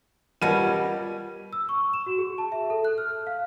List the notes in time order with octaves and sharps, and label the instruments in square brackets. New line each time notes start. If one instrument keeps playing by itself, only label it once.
[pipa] B2 C#4 [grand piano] G3 D#7 [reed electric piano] F4 A#4
[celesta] E6
C#6
E7
F#4
G#4
A5
E5
A4
F#6
F6
F5